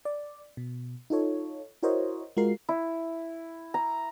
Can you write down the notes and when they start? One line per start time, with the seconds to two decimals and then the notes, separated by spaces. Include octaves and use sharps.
0.05 D5
0.57 B2
1.10 D#4 F4 A4 C#5
1.83 E4 F#4 A#4 C5 C#5 D#5
2.37 G#3 F4 F#4 A#4 C7
2.69 E4
3.74 A#5